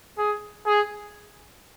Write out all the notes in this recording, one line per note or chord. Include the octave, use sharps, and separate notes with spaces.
G#4
G#4